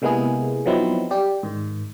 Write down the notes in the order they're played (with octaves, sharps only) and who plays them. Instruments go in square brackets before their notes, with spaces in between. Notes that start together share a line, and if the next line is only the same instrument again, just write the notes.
[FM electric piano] C3 G#3 A#3 B3 E4 G#4
F3 F#3 B3 C4 D#4 E4
G4 D5
G#2 D#3